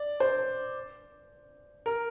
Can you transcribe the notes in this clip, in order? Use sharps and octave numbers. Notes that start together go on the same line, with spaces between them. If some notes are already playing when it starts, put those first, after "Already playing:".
Already playing: D5
C5
A#4